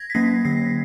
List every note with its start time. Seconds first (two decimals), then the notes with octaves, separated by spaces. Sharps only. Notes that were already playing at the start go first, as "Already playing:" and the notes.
Already playing: G#6 A#6
0.10 B6
0.15 F#3 A#3 C#4 A#6 C7
0.45 D3 A#6 C7